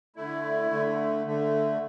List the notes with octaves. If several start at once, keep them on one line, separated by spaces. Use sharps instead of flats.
D3 A3 E4
D3 A3
D3 A3